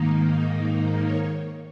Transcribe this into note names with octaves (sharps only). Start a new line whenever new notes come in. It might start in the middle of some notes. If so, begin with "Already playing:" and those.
Already playing: G#2 D#3 A#3 D#4
C#5